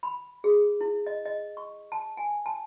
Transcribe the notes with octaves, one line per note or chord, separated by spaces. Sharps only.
B5
G#4
E4
D#5
D#5
C#6
A5
G#5
A5